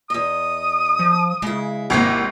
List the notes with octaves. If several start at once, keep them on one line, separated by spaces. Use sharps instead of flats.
E2 D#5 D#6
F3
C#3 G#3 E4
G#1 C3 D#3 E3 A#3 C7